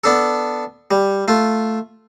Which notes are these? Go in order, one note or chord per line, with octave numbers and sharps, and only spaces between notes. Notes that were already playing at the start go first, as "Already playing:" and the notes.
B3 D4 A4
G3
A3 F4